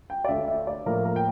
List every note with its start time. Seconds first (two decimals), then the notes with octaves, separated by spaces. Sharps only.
0.10 G5
0.25 D5
0.28 D2 D3 A3 E5
0.48 E5
0.67 D5
0.86 A2 F3 A#3 A#4
1.05 A#4
1.16 G5